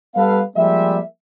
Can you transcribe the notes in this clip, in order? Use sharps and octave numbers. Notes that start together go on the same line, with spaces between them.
G3 B3 A4 B4 F5
F3 G3 G#3 A#3 D5 E5